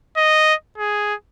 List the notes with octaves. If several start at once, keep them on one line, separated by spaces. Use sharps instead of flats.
D#5
G#4